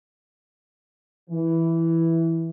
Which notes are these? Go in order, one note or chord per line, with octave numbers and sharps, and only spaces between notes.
E3